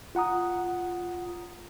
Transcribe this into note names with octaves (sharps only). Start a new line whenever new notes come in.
F4 F#5 A#5 D#6